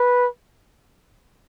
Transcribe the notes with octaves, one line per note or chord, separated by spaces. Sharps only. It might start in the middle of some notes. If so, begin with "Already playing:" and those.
Already playing: B4